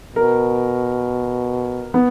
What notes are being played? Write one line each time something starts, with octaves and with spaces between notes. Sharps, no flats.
B2 A#4
B3